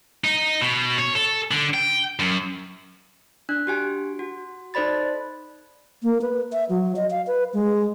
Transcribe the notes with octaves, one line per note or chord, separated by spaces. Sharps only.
D#4
B2
C#5
A4
D3
G5
F#2
D4 F#6
F#4 G4 G#5
F#4
D#4 A4 C5 D5 B5 A6
A#3
B4
E5
F#3
D#5
F5
B4
G#3